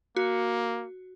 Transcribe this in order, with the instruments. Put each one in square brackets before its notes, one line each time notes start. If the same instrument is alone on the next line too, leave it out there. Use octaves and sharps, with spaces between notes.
[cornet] A#3 [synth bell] F#4